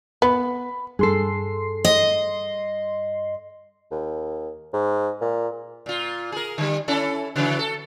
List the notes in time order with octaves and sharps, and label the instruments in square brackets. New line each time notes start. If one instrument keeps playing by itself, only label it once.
[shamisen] B3 [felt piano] B5
[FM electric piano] G2 C6 C7 [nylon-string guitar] G#4 A4
[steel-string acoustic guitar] D#5
[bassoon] D#2
G#2
A#2
[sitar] A#2 F4
G#4 A#4
D3 G3
C#4 E4 A4
C#3 E3 F#3
A4